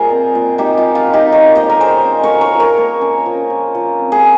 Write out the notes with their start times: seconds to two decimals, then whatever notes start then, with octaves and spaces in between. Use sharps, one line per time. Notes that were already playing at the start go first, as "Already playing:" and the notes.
Already playing: A#2 G3 F4 G#4 A#4 C5 D#5
0.10 C4
0.35 A#2
0.58 A#3 D#4 G4
0.78 F4
0.84 D#3
0.95 F4
1.07 D#3
1.13 D#4 G4
1.32 G3 A#4 C#5
1.55 A#3 C5 D#5
1.69 A#4
1.80 D#3 G#4 C5
2.05 C#4
2.23 A#4 C#5
2.29 F3
2.41 A#4 C#5
2.53 F3
2.60 A#4 C#5
2.78 A#3
3.01 C#4
3.26 F3
3.50 F3
3.75 F3
3.99 C4
4.12 G#4